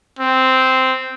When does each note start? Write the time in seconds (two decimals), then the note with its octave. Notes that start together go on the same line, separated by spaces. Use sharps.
0.19 C4